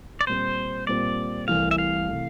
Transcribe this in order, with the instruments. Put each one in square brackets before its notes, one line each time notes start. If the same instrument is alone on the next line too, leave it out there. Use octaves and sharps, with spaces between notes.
[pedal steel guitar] D5
[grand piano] A#2 G3 C4 [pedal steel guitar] C5
[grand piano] A#2 G3 C4 [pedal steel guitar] D5
[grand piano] C2 C3 E3 A3 [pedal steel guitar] F5
[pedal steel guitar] E5
F5
[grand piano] C3 E3 A3